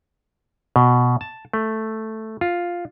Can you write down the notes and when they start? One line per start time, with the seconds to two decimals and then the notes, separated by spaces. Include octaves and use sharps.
0.76 B2
1.21 A5
1.54 A3
2.41 F4